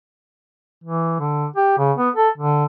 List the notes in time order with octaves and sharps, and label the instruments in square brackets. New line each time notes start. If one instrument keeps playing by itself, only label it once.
[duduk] E3
D3
G4
C#3
B3
A4
D3